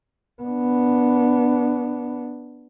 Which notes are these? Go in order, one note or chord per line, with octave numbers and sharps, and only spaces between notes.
B3 D4